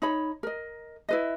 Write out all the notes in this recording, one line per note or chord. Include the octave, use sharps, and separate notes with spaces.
D#4 C#5 B5
A#4 D#5
E4 B4 D#5